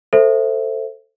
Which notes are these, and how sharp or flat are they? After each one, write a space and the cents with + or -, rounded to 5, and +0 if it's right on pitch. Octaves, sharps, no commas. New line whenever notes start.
A4 +20 C5 +0 E5 +0